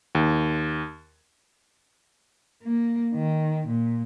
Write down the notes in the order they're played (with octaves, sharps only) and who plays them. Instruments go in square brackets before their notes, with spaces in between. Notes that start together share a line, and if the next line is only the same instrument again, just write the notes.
[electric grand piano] D#2
[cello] A#3
D#3
A#2